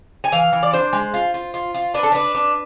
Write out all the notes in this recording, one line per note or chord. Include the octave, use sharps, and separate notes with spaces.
G#5
E3 F5
E3
D5
D4 C5
G#3
F4
F4
F4
F4
D4 B4
A4
D4 B4
D4